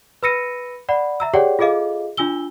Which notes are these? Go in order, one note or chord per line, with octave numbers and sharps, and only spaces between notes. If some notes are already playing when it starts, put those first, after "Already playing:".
B4 B5 E6 A#6 C#7 D#7
D5 F#5 B5
E5 A#5 E6
G4 G#4 C#5 D5 F#5 G5
F4 G#4 A4 D#5 F5
D4 F4 G#5 E6 G7